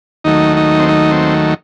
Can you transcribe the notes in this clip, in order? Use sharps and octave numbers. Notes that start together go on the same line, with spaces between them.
D#2 D#3 F#3 A3 D#4
D#4
C4
D#4
C4